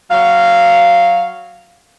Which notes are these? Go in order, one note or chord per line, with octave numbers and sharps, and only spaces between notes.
F#3 F5